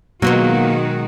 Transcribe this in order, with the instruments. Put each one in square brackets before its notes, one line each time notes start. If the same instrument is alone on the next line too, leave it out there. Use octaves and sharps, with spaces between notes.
[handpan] B2 [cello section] D#3 G#3 F#4 [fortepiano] F#3 [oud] A#3 B3 F4